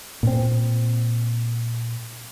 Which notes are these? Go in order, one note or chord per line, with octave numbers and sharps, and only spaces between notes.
A#2 C4